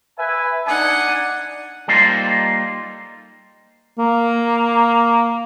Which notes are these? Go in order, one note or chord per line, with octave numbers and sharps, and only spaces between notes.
B4 E5 G#5
D4 D#4 F#5 G#5
G3 A#3 D#4 F4 A4 C5
A#3